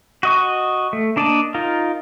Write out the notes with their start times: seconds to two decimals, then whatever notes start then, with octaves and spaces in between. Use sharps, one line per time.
0.23 F#4 D#5 C#6
0.93 A3
1.16 A#3 D4 D5 D#5 A5
1.54 D#4 F4 A#4